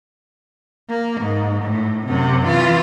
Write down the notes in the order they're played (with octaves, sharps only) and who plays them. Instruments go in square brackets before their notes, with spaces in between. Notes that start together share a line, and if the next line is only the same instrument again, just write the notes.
[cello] A#3
G#2
A2
F#2 C3
E3 F4